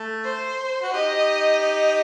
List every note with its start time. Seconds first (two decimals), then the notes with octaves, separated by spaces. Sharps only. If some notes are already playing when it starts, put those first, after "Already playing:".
Already playing: A3
0.24 C5
0.82 F#4
0.93 D#4 G4 D#5
1.62 D#5